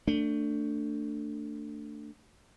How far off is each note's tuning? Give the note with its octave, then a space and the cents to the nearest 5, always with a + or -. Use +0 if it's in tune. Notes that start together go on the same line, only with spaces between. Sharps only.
A3 +25 D4 +0